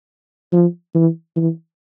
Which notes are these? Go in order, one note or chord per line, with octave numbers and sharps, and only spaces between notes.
F3
E3
E3